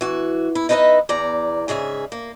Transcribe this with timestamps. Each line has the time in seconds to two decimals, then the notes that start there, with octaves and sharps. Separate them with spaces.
0.01 E3 F#4
0.55 E4
0.69 D#4 E4 B4 C5 D#5 E5
1.09 E2 D5 A#5
1.68 G#2 C#3 G#4 E5
2.12 A#3